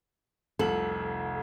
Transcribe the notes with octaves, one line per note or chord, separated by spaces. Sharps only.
F1 C2 A4 F#7